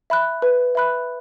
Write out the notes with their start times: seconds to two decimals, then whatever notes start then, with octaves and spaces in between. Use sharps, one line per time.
0.10 E5 B5 F#6
0.42 B4
0.75 E5 B5 F#6